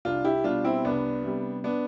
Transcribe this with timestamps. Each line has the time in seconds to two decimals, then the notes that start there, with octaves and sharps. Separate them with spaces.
0.05 C2 D4 F4
0.25 E4 G4
0.44 B2 G3 D4 F4
0.64 C4 E4
0.85 C2 B3 D4
1.24 C3 G3
1.64 B3 D4